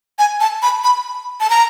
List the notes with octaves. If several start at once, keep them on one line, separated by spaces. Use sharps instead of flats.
G#5
A5
B5
B5
A5
A#5